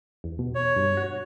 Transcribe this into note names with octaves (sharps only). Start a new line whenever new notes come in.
E2
B2
C#5
G2
F#4